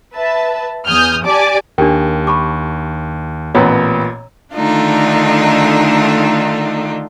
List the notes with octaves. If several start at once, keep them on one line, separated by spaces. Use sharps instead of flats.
B4 E5 A5
E2 G#5 D#6 F6 G6
G4 D5 G#5 A5 D6
D#2 D4 G4 A#4 G5
A5 B5 C#6 D6
A1 A#2 B3 C#5 A#5
D3 D#3 A3 D4 D#4 F4